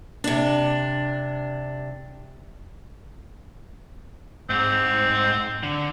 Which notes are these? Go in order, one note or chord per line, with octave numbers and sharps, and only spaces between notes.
C3 D4
G#2 C4
D3